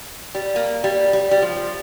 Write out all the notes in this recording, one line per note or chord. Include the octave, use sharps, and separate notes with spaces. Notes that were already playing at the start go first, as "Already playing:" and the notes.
G3
A#3
G3
G3
G3
F3